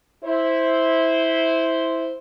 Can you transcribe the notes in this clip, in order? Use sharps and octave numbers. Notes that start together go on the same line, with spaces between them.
E4 C5